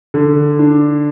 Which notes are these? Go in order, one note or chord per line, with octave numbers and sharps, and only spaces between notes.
D3
D4